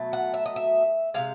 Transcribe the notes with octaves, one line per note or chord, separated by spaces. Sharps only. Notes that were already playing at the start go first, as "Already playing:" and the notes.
Already playing: B2 F#3 A3
F#5
E5
D#5
E5
C3 F3 G#3 F5